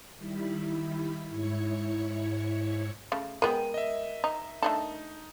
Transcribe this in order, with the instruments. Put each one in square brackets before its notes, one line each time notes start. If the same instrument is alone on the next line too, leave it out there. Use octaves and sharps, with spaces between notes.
[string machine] D#3 G3 E4 B5
G#2 E4 C#5 G#6 C#7
[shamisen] C#3 A3
[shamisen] G#3 B3 G#4 [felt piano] A#4 [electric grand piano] G5 D#7
[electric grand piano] D#5 E5
[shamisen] D#4
[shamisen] A3 D4 A4 [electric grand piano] D#4